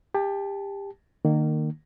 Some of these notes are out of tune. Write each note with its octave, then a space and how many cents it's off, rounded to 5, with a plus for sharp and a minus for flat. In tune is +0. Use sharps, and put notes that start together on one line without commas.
G4 +25 A5 -15
D#3 -30 A#3 -20